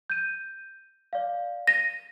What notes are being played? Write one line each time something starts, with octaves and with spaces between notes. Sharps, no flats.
G6 D#7
D5 F5
A#6 D#7